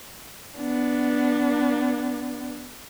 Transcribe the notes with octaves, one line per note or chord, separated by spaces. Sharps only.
B3 D4